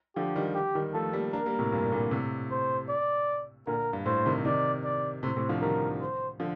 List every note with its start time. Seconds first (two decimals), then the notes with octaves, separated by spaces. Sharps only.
0.16 D3 F3 G4
0.36 D#3 G3
0.55 G4
0.75 D#3 G3
0.94 F3 A3 A4
1.13 G3 A#3
1.33 A#3 D4 A#4
1.46 G3 A#3
1.59 A2 C3
1.72 G2 A#2
1.92 A#2 D3
2.11 A2 C3
2.51 C5
2.89 D5
3.67 A#2 D3 A#4
3.93 G2
4.06 A2 C5
4.26 C3 D#3
4.45 C3 D#3 D5
4.84 D5
5.23 A2 C3 C5
5.36 A2 C3
5.49 D3 F3
5.62 D#3 G3 A#4
6.01 C5
6.40 D3 F3